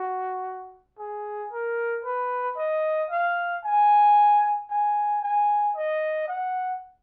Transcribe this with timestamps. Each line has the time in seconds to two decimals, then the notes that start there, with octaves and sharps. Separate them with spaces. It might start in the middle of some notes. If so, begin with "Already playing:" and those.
Already playing: F#4
0.99 G#4
1.52 A#4
2.04 B4
2.57 D#5
3.10 F5
3.64 G#5
4.70 G#5
5.23 G#5
5.76 D#5
6.28 F#5